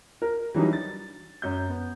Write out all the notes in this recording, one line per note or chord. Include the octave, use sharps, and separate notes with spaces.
A#4
E3 F#3 G3 D4 D#4
A6
F#2 G6
B3